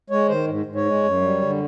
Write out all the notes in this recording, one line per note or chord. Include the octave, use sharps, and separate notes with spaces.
G#3 C#5
D#3 C5
G#2
G#2
C#5
G#3
F#2
G3
D3